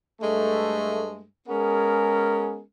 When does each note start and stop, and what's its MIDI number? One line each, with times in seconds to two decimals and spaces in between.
0.22 1.24 43
0.22 1.24 56
0.22 1.24 57
1.48 2.61 56
1.48 2.61 59
1.48 2.61 61
1.48 2.61 68
1.48 2.61 70